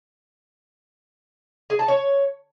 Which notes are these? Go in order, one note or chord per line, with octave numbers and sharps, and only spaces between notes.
G#4
A5
C#5